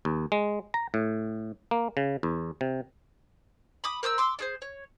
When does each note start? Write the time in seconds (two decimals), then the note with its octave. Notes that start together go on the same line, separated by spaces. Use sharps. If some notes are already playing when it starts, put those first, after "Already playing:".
0.05 D#2
0.32 G#3
0.74 A#5
0.94 A2
1.71 A#3
1.97 C#3
2.23 E2
2.61 C3
3.84 B5 D6 D#6
4.03 A#4 C5 D#6 E6
4.18 C6 D6 E6
4.39 D4 G#4 C5
4.62 C#5